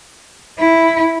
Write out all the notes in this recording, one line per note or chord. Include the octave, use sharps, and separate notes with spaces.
E4